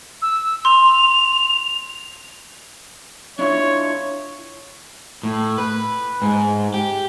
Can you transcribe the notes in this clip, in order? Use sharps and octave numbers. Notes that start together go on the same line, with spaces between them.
E6
C6 F7
D4 E4 F4 C#5
A2
B4
G#2
G4